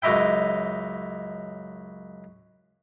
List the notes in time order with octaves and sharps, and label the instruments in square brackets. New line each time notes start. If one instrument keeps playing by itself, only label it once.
[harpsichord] C#2 F#2 D#4 E4 G5